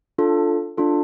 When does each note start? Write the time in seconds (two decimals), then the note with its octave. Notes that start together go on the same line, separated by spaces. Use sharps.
0.18 D4 F4 A4
0.77 D4 F4 A4